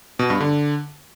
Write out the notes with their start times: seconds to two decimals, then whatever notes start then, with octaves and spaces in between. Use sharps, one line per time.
0.19 B2
0.30 G2
0.40 D3